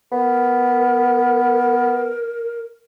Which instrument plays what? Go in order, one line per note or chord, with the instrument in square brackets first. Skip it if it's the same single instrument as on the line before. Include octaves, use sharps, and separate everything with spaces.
[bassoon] B3 [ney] A#4